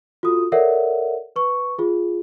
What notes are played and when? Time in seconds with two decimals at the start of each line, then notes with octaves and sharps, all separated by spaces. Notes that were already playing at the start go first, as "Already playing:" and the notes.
0.23 F4 F#4 A4 D#6
0.52 A4 A#4 C#5 D5 E5 F#5
1.36 B4 C#6
1.78 F4 G#4